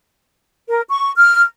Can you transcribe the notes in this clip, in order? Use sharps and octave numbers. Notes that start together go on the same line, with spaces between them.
A#4
C#6
F6